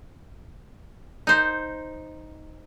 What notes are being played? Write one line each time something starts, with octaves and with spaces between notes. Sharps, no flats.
D#4 C5